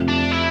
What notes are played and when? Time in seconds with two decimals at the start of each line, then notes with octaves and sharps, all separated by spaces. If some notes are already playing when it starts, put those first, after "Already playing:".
Already playing: F2 C3 F3 A3
0.08 D4
0.32 E4